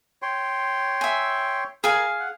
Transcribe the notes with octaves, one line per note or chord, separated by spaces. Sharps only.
C#5 G5 C6
E5 G#5
G#4 A#4 F5 G#5
F#5